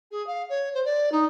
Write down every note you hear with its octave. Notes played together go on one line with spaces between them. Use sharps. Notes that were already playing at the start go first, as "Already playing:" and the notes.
G#4
F5
C#5
C5
D5
D#4